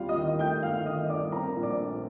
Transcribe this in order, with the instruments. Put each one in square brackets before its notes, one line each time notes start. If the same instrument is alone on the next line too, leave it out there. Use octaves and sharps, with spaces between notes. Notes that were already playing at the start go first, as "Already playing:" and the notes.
Already playing: [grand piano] D#2 G3 C4 F4 F5
D#5 D#6
D#3
A3 G5 G6
G1 F5 F6
D#3 D#5 D#6
G2 D5 D6
C4 A#4 A#5
A#1
D5 D6
A3